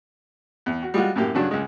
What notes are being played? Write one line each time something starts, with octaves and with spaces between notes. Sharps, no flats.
E2
F#4
G3 G#3 F4 F#4
F#2 A2 A#3 G4
G2 C#3 F#3 D4
C#2 G#3